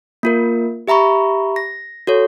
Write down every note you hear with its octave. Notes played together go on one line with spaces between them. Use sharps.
A#3 F4 A#4
G4 E5 A#5 B5 C#6
A#6
F#4 A4 C#5